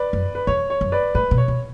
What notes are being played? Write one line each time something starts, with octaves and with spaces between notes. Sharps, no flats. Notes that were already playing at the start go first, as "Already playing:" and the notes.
Already playing: B4 D5
F#2
B4
E2 C#5
C#5
F#2
B4 D5
A2 B4
B2
C#5
B2